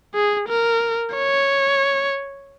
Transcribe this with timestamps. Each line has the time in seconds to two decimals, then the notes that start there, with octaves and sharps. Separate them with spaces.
0.14 G#4
0.48 A#4
1.15 C#5